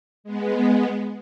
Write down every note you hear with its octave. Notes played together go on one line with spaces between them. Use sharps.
G#3 B3